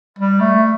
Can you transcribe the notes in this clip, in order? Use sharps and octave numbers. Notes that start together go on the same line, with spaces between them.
G3
A3